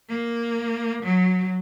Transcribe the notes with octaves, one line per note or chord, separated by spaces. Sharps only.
A#3
F#3